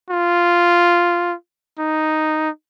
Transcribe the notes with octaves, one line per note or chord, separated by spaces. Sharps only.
F4
D#4